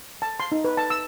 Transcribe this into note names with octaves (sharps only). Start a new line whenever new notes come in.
A5
C6
D#4
B4
A5
E6